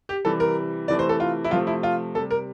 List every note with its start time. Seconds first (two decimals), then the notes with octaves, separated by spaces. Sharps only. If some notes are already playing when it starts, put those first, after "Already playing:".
0.09 G4
0.25 C3 E3 G3 A4
0.40 A#4
0.88 C3 E3 A3 D5
0.99 C5
1.09 A4
1.20 F4
1.44 E4
1.51 C3 F3 A3 F4
1.67 E4
1.83 F4
2.15 C3 A4
2.18 G3
2.31 A#4